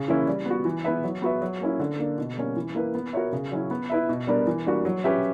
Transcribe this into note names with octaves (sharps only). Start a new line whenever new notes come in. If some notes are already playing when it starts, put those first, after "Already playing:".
Already playing: C#3
E3 A#3 C#4 E4
G3
B3 F#4
E3
B3 E4 B4 E5
F#3
B3 F#4 B4 E5
F#3
A#3 C#4 E4
D3
A#3 D4
B2
G3 A#3 C#4
E3
A#3 E4 B4
B3
F#4 A#4 C#5 E5
C#3
F#3 C#4 E4
B3
E4 B4 E5
B2
G3 B3 D4 A#4
E3
G3 A#3 D4 F#4
F#3
C#4 G4 B4 E5